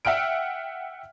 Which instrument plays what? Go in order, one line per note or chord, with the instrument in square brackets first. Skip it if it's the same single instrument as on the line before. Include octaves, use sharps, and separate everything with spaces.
[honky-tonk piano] E5 F#5 G5 F6 D7